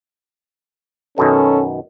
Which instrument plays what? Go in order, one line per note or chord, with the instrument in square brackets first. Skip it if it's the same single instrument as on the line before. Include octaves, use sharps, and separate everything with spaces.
[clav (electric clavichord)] F#2 B2 D#3 [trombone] C#4 [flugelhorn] A4